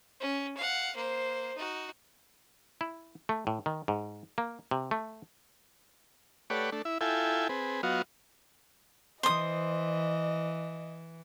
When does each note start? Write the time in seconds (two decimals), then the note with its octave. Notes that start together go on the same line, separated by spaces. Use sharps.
0.20 C#4
0.57 F5 F#5
0.96 A#3 C5
1.56 D#4 F#4
2.81 E4
3.29 A3
3.47 A2
3.66 D#3
3.88 G#2
4.38 A#3
4.71 C3
4.91 A3
6.50 A3 G4 B4 C#5 D5 F#5
6.72 A3 D4
6.85 E4 E5
7.01 E4 F4 A4 E5 G5 G#5
7.49 C4 G#4 B4
7.83 F#3 B3 F4 F#4 D#5 F5
9.23 E3 C5 D#5 D#6